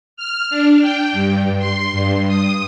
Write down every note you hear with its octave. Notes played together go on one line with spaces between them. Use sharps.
F6
D4
G5
G2
C6
G2
D#6